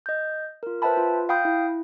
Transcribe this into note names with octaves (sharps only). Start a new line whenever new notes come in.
D#5 G6
F4 A#4
B4 C5 E5 G5 A5 B5
F4
F5 G5 B5 D#6 G6
E4